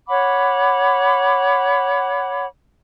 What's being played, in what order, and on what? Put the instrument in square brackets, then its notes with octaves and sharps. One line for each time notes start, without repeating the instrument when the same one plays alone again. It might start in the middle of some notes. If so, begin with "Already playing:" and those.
[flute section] C#5 F#5 B5 D6